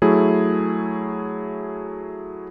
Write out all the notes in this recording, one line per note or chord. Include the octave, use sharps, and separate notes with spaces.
F#3 A3 E4 G#4